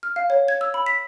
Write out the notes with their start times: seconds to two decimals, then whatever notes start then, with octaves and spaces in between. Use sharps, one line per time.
0.03 F6
0.16 F5
0.30 C#5
0.48 G#6
0.61 E6
0.74 B5
0.86 B6